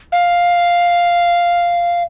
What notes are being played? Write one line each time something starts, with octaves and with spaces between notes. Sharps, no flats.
F5